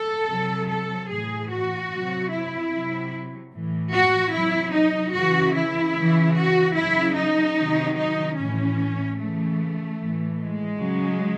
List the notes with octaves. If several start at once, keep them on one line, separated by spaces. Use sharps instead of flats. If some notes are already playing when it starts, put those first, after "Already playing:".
Already playing: A4
C3 F#3
A4
A2 E3 G#4
F#4
C3 F#3
E4
C3 F#3
A2 E3
F#4
C3 F#3 E4
D#4
C#3 E3 F#4
E4
C#3 E3
F#4
C#3 F#3 E4
D#4
C3 D#3 F#3
D#4
A2 E3 C#4
C#3 E3 A3
A2 E3
G#3
C#3 F#3